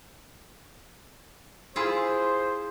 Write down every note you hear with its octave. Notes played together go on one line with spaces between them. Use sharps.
E4 F4 G#4 C5